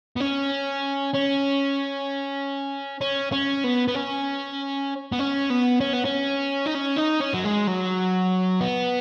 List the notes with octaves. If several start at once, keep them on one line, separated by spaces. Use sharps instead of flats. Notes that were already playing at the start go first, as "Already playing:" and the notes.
B3
C#4
C#4
C#4
C#4
B3
B3
C#4
B3
C#4
B3
C#4
B3
C#4
D#4
C#4
D#4
C#4
F#3
G#3
F#3
B3